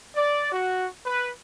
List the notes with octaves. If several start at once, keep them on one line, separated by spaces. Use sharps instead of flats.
D5
F#4
B4